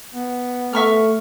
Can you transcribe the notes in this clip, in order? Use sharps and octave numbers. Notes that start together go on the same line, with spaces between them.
B3
A3 E5 C#6 F6